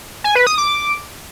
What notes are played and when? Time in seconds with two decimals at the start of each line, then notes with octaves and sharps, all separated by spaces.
0.24 G#5
0.35 B4
0.47 D#6
0.58 D6